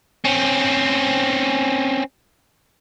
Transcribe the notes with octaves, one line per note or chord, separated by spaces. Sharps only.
C4 C#4